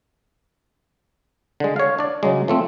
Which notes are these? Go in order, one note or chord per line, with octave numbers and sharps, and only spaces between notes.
D3 G#3
C#5 F5
D4 D5
C#3 F#3 G#3
F3 A3 C4